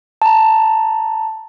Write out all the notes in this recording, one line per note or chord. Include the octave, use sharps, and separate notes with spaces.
A5 A#5